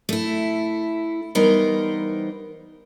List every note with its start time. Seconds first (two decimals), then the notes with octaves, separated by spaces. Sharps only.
0.09 A3 E4
1.35 E3 G3 B3 D#4 A#4 C5